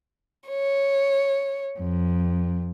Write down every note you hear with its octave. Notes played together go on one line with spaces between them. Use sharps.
C#5
F2